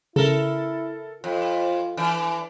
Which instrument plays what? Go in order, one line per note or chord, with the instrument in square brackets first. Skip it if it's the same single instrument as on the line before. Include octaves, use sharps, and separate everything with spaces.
[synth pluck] C#3 [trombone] E4 [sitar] A4 A#4
[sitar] F2 [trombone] F4
[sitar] E3 D4